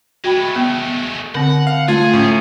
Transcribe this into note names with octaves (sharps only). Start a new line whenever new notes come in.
G#3 A3 F#4 G5 B5
B3
D3 C4 F#5
F5
A3 F4 G#4 G#5
A2 C#4